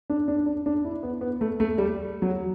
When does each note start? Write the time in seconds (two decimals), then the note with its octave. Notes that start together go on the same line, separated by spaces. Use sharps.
0.10 D4
0.28 D4
0.46 D4
0.66 D4
0.85 E4
1.03 B3
1.21 B3
1.41 A3
1.60 A3
1.78 G3
2.22 F#3